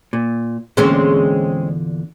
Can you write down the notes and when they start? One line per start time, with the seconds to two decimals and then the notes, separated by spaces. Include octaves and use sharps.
0.13 A#2
0.77 E2 A#2 D3 G#3 C4 C#4